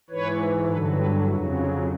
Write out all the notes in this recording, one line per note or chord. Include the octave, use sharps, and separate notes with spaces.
G#2 E3 B4 C#5
G2 D3 F#3 A4 B4
A4 B4
F2 C#3 F#3 E4 F#4
D#4 F4